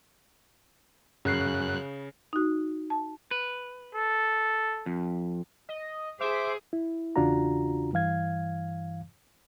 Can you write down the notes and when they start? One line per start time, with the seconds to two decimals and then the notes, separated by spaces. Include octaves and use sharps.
1.25 F#2 C#3 F#6 C7
2.33 D#4 F#4
2.90 A5
3.31 B4
3.95 A4
4.86 F2
5.69 D#5
6.21 G#4 C5 E5 D6
6.73 E4
7.16 E2 C#3 D4 F4 F#4 A#5
7.93 G2 E3 F5 G#6